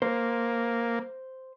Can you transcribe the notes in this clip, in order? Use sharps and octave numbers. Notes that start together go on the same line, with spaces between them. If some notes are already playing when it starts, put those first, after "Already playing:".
A#3 C5